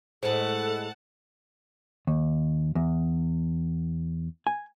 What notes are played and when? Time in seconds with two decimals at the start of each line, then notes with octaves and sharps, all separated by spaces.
0.23 A2 G#3 A4 C5 F#5 A5
2.07 D#2
2.75 E2
4.47 G#5